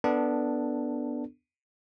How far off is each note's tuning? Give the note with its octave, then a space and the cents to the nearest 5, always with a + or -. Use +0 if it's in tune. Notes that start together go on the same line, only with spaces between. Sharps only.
B3 +0 D4 +0 A4 +15